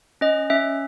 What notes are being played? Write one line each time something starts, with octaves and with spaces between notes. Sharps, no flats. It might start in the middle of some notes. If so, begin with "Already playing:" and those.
C#4 D#5
C#4 E5